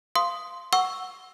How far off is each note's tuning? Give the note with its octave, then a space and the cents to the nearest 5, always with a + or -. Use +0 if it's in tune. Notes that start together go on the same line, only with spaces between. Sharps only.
F5 -10 C6 +0 D#6 +0
F#5 +0 C#6 +0 E6 +0